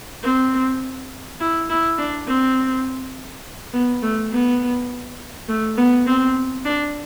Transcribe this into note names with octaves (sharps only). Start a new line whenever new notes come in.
C4
E4
E4
D4
C4
B3
A3
B3
A3
B3
C4
D4